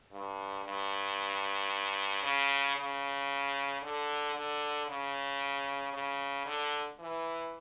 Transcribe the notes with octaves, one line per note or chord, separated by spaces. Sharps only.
G2
G2
C#3
C#3
D3
D3
C#3
C#3
D3
E3